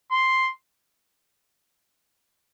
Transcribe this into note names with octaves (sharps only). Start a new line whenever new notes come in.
C6